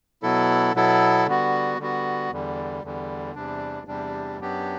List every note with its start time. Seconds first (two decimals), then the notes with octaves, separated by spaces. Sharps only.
0.22 B2 F#3 B3 E4 A4
0.75 B2 F#3 B3 E4 A4
1.26 D3 G3 B3 F#4
1.79 D3 G3 B3 F#4
2.32 E2 D3 G3
2.83 E2 D3 G3
3.35 E2 C3 G3 D4
3.87 E2 C3 G3 D4
4.40 F#2 F#3 B3 D4 G4